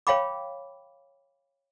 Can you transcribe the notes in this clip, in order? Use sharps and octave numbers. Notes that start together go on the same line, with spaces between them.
C#5 F5 G5 B5 D6